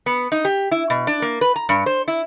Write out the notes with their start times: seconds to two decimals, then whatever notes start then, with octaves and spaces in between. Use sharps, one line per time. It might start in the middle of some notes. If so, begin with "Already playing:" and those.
0.06 B3
0.32 D#4
0.45 G4
0.71 E4
0.90 B2
1.07 D4
1.22 A#3
1.41 B4
1.56 A#5
1.69 G2
1.86 C5
2.08 E4